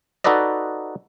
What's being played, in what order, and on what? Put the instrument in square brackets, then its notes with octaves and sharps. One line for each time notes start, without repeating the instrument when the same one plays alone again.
[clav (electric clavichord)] D#4 F#4 A4 B4 D5 D#5